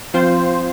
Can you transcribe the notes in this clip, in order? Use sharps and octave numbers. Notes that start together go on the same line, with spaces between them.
F3 C4 F4 C5